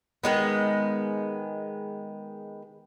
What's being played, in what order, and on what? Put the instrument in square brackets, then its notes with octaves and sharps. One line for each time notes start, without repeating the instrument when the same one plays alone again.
[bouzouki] D#3 G#3 B3